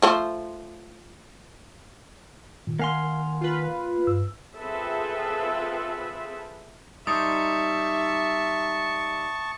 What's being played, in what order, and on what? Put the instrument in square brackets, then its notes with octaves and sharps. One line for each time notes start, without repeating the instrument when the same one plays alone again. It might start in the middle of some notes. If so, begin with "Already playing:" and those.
[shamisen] F3 A3 C5
[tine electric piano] A#2 [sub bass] D#3
[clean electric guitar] A#3 F5 C6 [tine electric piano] A#4 F#5 G#5
[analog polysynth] F4 B4
[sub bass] G2 [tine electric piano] E6
[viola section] C4 F4 G#4 A4 B4 E5
[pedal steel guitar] G3 D#4 C5 [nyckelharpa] E5 [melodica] A5 C#6 [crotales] D#6